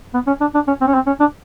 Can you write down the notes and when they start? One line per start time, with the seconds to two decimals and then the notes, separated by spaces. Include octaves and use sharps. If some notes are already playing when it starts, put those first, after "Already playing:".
0.14 B3
0.27 C#4
0.41 D4
0.54 D4
0.67 C#4
0.81 C4
0.87 C#4
0.94 C4
1.07 C#4
1.20 D4